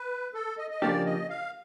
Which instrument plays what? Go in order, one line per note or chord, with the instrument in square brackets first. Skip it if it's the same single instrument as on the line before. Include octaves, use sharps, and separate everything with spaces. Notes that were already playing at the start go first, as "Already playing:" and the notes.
Already playing: [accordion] B4
A4
D#5
D#5
[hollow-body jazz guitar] C#3 F3 A#3 D4 G4 [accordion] D5
[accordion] D#5
F5